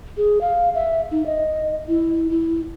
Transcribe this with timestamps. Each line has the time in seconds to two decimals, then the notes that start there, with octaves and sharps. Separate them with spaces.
0.17 G#4
0.41 F5
0.75 E5
1.11 D#4
1.26 D#5
1.88 E4
2.30 E4